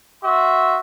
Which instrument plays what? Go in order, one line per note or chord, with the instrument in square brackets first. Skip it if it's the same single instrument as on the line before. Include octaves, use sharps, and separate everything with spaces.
[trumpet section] F#4 E5 C6